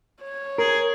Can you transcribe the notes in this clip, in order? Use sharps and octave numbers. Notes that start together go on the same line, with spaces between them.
C#5
G#4 A#4